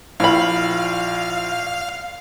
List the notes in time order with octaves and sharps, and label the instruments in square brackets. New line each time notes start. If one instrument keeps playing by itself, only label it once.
[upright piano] A#1 [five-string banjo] E4 B5 [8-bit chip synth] F5